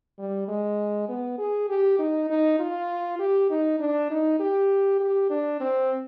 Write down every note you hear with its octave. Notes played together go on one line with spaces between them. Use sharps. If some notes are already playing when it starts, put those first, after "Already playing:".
G3
G#3
B3
G#4
G4
D#4
D#4
F4
G4
D#4
D4
D#4
G4
G4
D4
C4